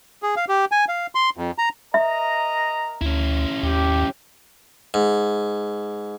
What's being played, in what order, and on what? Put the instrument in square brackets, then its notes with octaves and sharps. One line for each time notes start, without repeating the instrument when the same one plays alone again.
[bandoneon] G#4
F5
G4
G#5
F5
C6
F2
A#5
[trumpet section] A#4 D#5 A#5 [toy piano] E5
[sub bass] D2 [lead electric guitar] C#4 E4
[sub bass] D#2 [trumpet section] G4
[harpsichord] G#2